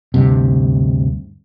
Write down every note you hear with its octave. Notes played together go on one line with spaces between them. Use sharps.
D2 G2 C3